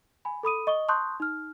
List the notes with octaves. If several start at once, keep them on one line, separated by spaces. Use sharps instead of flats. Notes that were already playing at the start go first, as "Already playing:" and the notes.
G#5 B5
A4 B5 D#6 D#7
D#5 C#6 D#6 G7
A5 C6 C#6 D#6 F#6 G6
D#4 F6